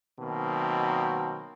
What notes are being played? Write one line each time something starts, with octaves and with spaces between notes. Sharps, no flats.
B2 D#3 F#3 A#3 C4